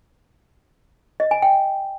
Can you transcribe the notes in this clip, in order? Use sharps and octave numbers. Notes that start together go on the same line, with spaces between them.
D#5
G#5
G5